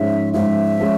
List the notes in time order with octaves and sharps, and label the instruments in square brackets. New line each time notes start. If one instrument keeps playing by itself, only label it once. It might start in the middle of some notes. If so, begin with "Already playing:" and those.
Already playing: [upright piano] G#2 F3 G#3 C#4 [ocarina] E5
[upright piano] G#2 F3 G#3 C#4 [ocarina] E5
[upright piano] F3 G#3 C#4